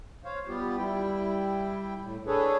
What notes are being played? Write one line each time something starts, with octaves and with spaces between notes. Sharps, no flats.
C5 C#5 F5
G3 B3 F4 G4
G3 E4 G5
A2
D4 G#4 A4 B4 C#5